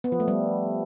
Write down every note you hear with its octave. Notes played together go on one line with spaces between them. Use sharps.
B3
F3
A3
G3